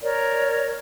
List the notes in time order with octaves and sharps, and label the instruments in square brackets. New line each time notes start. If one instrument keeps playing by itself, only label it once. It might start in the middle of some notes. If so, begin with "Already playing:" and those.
[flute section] A#4 C#5 D5